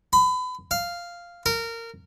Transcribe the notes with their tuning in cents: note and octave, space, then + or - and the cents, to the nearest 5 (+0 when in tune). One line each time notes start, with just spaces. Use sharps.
B5 +30
F5 -5
A#4 -20